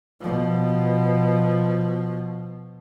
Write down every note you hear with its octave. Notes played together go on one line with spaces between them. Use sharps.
B2 F3